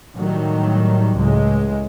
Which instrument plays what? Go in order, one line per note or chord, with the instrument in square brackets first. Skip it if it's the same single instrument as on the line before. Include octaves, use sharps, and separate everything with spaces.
[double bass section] A2 D#3 F#3 G3
C#2 A2 G#3